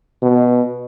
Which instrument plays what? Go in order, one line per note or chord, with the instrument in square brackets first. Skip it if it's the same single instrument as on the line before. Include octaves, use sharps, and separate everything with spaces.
[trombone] B2